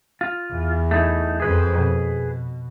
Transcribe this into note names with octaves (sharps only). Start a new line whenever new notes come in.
F4
E2
A3 D#4 E4
F2 F3 G#4 B4
B2